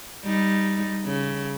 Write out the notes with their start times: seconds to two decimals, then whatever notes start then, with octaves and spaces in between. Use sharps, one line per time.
0.24 G3 D#4
1.05 C#3